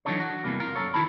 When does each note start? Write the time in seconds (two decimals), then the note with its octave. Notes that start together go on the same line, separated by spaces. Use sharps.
0.05 E3 F#3 D4 D#4 A4 C#5
0.20 F#4
0.44 E2 G2 C3 E3 G3 A#3
0.60 F4 A#4
0.75 F#2 A4 C#5
0.94 D#3 G#3 E4 F#4 A5 B5